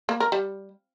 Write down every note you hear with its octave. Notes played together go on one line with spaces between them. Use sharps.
A#3
A#4
G3